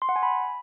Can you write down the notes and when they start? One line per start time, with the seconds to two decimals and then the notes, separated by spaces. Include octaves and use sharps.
0.02 C6
0.09 F#5
0.16 G#5
0.23 B5